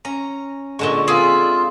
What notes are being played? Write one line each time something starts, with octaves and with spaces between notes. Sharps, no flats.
C#4 A#5
A#2 D3 G#3 D#5 A5 C#6
C4 F4 G#4 D5 E5